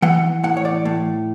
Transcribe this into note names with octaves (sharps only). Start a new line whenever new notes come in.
E3 F#5
A2 F#5
C#5
D5
A2